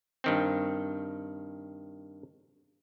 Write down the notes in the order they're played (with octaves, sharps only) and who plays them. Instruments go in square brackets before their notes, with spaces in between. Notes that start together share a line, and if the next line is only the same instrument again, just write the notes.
[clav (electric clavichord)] G2 D#3 C4